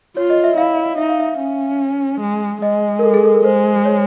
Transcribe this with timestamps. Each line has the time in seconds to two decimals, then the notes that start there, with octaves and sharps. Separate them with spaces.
0.17 F4 C#5
0.30 D#5
0.44 E5
0.57 E4 F5
0.98 D#4 E5
1.09 F5
1.20 E5
1.39 C#4
2.21 G#3
2.62 G#3 D#5
2.99 A#4
3.03 A4
3.14 G#4
3.24 A4
3.34 A#4
3.44 G#3 C5
3.85 C#5